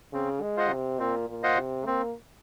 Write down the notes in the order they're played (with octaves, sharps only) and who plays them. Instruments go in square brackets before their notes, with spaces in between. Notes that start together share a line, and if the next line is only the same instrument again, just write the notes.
[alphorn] C#3 [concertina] C4
[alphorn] G#3
[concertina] F4 C5 D#5 F#5
[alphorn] C3
[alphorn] A#2 [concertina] C4
[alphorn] A#2
[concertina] F4 C5 D#5 F#5
[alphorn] C3
[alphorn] A#3 [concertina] C4